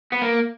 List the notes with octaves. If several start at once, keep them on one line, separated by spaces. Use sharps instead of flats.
B3
A#3